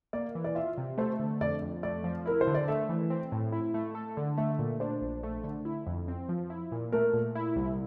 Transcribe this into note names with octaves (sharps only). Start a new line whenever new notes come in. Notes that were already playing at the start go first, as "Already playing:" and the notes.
A#3 D5
E3
D5
F4 E5
C3
A3 C5
D3
F2 D5
F2
A3 D5
F3
E4 A#4
C5
D3
D5
A3 E5
E3
C4
A2
E4
A3
A4
D3
A3 E5
A#2
D4 C5
A#1
A3
D3
E4
F2
C4
F3
E4
A#2
A3 A#4
A#2
E4
C2